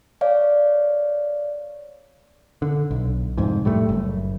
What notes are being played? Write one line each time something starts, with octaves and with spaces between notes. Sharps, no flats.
C#5 D5 F5
D3
B1
C2 F2 G#2
A2 G3 A3
F#1